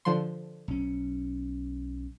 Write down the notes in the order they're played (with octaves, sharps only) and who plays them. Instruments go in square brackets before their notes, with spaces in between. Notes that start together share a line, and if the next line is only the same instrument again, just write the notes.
[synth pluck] D3 F3 C6
[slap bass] B1 C#4